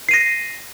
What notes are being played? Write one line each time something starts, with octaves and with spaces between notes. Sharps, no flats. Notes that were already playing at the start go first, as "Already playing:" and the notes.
A#6 C7 D#7